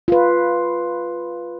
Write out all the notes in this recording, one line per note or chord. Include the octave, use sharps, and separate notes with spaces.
F4 B4